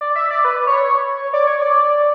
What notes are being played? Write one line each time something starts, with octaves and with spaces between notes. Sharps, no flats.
D5
E5
D5
B4
C#5
D5
C#5
D5